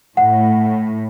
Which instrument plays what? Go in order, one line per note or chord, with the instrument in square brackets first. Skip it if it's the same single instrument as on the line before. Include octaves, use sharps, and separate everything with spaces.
[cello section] A2 [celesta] F#5